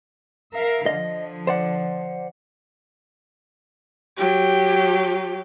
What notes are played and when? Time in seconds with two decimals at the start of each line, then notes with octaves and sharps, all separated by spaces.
0.53 A#4 E5 F5
0.86 D3 F3 D#5
1.47 C5 D5 F#5
4.17 F#3 G4